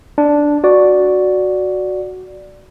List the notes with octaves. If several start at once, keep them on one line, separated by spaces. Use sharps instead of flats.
D4
F#4 D5